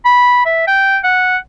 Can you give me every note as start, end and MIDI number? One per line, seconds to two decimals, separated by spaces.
0.05 0.43 83
0.46 0.62 76
0.67 0.98 79
1.04 1.37 78